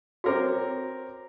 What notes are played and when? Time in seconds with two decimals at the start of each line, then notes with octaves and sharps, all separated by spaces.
0.24 C4 F#4 A#4 C#5 F#5 D6